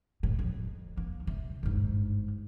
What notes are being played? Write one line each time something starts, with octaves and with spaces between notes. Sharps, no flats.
A2
F2
A#3
C3
G1 G#2